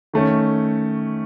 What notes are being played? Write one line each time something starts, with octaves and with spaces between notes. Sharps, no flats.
D#3 A3 C#4